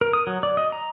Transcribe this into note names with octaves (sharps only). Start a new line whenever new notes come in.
A#4
D#6
F#3
D5
D#5
A#5